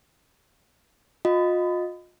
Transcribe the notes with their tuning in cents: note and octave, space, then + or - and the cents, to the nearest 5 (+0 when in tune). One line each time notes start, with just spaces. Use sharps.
F4 +40 D#5 +0 B5 +35